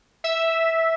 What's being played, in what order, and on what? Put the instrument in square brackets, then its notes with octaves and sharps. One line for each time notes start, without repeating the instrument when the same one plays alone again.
[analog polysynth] E5